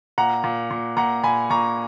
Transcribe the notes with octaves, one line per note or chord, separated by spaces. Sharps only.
A#2 F#5 A#5
A#2
A#2
A#2 F#5 A#5
A#2 G#5 B5
A#2 A#5 C#6